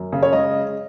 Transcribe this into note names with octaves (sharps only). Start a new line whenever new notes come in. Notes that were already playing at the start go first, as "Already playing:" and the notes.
Already playing: F#2
C#3
C#5
G#3 D#5